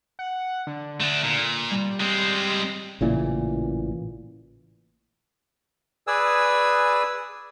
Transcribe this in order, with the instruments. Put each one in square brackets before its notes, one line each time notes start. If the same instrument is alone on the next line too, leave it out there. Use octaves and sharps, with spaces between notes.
[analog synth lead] F#5
D3
[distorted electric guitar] A3 D4
A#2
[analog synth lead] G3
[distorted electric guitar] G#3 C4
[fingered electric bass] A1 A#2 C#3 E3
[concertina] G#4 B4 D5 G#5 D#6 E6